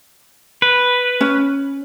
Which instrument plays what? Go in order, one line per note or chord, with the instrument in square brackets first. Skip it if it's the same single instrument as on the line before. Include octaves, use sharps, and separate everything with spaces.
[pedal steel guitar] B4
[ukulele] C#4